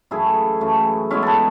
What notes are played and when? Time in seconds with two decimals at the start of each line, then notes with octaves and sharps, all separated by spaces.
0.11 F#2 C#3 E3 A3 E4 G#4
0.61 F#2 C#3 E3 A3
1.10 B2 G#3 B3 C#4 E4
1.23 G#4 A4 B4